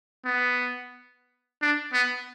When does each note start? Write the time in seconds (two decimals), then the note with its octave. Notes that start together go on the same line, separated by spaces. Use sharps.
0.26 B3
1.62 D4
1.93 B3